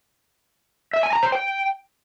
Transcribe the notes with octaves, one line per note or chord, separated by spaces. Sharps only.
E5
G#5
A#5
C5
G5